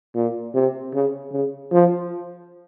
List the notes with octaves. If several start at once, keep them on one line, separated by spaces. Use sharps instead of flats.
A#2
C3
C#3
C#3
F3